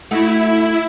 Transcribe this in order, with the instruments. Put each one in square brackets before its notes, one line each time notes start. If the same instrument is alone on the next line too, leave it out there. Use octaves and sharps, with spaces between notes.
[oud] A3 D#4 F#4 [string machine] E4